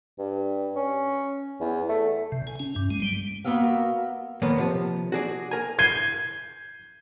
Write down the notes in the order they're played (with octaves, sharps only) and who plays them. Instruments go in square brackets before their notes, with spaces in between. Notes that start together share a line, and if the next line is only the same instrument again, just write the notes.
[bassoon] G2
C#4
E2
A3
[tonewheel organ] C3
G#5
C#4
G2
G#3
G3
[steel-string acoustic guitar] A#3 B3 F#4 E5 F5
[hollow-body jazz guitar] D#2 A#2 A#3 B3
C3 F3
F#4 G#4 D5
A#4 G#5
[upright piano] G6 G#6 C7 D#7 G7